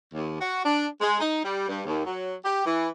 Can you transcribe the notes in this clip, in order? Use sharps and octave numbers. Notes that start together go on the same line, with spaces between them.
D#2
F#4
D4
G#3
D#4
G3
G2
D#2
F#3
G4
E3